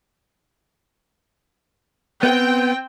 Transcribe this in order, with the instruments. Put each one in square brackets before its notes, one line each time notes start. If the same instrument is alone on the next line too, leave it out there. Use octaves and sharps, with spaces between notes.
[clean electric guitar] B3 [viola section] C4 G5